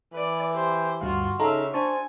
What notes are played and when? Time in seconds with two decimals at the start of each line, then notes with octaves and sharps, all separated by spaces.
0.13 E3 B4 D5
0.53 G4 C5
1.01 D2 G2 F4 F#4 F5
1.39 C#3 D#4 A4 E5 F5 A#5
1.74 D4 C5 G#5 A5 C#6